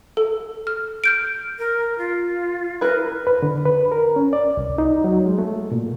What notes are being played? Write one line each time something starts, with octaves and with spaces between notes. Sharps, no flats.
A4
F6
F6 G6 D7
A#4
F4
E4 A#4 B4
B4
D3
B4
A#4
C#4
D5
C2
D#4
F#3
G#3
A3
A#2